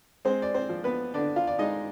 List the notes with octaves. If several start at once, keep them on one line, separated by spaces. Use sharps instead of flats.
G#3 C4 C5
D5
C4 C5
F3
B3 B4
D3 D4 D5
F4 F5
D5
G#3 D#4 D#5